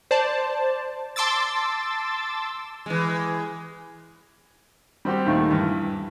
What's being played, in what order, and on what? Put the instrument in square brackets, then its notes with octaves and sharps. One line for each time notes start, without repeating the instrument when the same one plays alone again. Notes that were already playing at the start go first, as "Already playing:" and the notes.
[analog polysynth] C5 D5 A5
A5 C6 D6 E6 A6
[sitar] E3 G#3
[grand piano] G3 C4 F#4 G4
D#2 A#2 D#3 A3
G2 E3